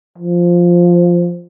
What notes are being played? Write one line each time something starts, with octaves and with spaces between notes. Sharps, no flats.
F3